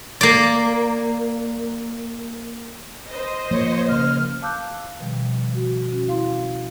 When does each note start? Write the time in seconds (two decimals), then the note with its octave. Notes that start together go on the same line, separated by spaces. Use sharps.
0.21 A#3 D5
3.11 C5 D#5
3.51 F3 A#3 C#5
3.88 C#3 A#3 F6
4.42 F5 A5 D6 E6 F#6 G6
5.00 B2 D#3 F3 G3
5.50 F3 F#4
5.92 C#4 F#4
6.07 E4 F5 C6